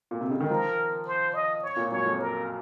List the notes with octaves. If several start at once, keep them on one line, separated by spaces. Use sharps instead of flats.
A#2
C3
C#3
D#3
F3 A#4
C5
D#5
C#5
A#2
F#2 C#5
F2
A#4